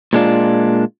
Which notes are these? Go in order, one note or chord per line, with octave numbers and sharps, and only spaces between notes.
A#2 G#3 D4 F4